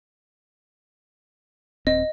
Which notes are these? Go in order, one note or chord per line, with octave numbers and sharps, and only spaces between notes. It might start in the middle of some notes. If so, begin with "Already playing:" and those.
D#1 C4 D#5